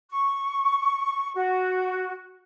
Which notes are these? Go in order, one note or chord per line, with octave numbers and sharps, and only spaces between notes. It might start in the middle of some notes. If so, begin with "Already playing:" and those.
C#6
F#4